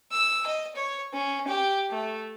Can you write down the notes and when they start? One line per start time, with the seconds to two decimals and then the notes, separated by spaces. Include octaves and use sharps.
0.12 E6
0.46 D#5
0.75 C#5
1.13 C#4
1.47 G4
1.91 A3